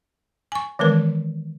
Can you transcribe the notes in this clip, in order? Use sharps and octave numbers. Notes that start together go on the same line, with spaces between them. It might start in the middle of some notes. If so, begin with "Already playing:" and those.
G#5 C#6
D#3 E3 G#3 B3 A#4 B4